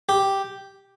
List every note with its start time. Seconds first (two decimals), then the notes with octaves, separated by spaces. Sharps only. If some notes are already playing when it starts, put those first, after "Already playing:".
0.09 G4